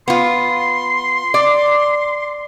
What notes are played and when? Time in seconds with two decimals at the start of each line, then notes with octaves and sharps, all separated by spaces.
0.08 B3 F4 C6
1.34 D5